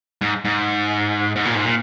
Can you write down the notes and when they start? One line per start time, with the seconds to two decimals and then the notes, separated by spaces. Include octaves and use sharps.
0.21 G#2
0.45 G#2
1.36 G#2
1.45 A#2
1.55 G#2
1.64 A#2